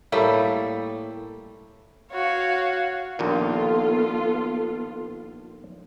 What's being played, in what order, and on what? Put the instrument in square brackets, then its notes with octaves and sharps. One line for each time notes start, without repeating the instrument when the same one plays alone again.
[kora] A2 G3 A3 A#3
[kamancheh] F#4 F5 [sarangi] C#5
[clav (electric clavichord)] A#1 D#2 A#2 [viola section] B3 F4 A4